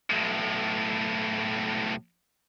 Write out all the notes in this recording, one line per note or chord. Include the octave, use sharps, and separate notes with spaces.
B1 A2